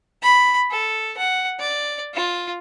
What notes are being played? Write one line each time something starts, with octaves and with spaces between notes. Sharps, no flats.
B5
A4
F#5
D5
F4